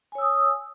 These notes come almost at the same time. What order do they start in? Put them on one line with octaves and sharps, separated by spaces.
G#5 C#5 E6 D#6